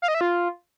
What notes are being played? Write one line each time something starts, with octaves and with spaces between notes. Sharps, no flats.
F5
D#5
E5
F4